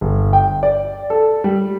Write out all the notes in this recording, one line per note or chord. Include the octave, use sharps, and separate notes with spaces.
G1
G5
D5
A4
G3